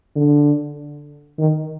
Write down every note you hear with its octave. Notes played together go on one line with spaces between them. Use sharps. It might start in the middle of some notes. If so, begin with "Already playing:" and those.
D3
D#3